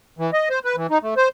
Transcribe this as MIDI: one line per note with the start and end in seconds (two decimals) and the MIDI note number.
0.19 0.31 52
0.33 0.49 75
0.50 0.59 72
0.65 0.76 71
0.76 0.87 52
0.90 0.98 63
1.02 1.14 57
1.17 1.28 72